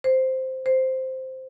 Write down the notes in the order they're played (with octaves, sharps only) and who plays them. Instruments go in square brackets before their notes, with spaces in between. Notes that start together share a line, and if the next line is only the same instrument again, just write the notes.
[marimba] C5
C5